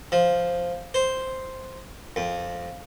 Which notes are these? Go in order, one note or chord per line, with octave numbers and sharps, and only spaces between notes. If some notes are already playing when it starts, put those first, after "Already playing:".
F3
C5
F2